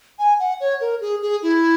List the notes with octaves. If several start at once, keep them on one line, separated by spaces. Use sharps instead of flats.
G#5
F#5
C#5
A#4
G#4
G#4
E4